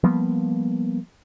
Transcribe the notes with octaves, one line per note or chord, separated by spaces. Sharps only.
F3 G3 A#3 B3